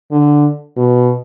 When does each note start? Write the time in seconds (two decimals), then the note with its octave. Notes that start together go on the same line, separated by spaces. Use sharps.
0.11 D3
0.77 B2